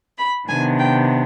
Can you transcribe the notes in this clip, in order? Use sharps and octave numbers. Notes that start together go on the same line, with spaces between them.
B5
C3 D#3 B3 D4 G#5
G5